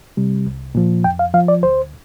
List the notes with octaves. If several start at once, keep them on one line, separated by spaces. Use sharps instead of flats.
C3 G3
C2
A#2 F3
F2 G5
F5
F3 F5
D5
D2 C5